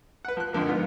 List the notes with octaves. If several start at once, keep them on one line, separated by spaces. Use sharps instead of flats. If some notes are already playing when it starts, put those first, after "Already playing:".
B4 F#5
F3 F#6
F2 D3 F3 A#3
G#2 B3 F4